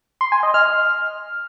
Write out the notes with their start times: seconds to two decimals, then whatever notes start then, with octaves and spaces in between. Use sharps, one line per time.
0.21 C6
0.32 G#5
0.43 D#5
0.54 F6